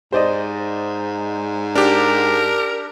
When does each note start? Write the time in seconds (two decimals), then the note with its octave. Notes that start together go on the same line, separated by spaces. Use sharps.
0.12 G#2 C5 D5 D#5
1.75 D4 G4 A#4